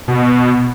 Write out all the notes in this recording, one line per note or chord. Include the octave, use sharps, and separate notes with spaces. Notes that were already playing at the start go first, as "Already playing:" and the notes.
B2